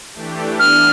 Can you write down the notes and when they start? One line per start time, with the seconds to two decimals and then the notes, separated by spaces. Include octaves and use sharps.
0.13 E3 A3 D4 G4
0.59 E3 B3 D4 F6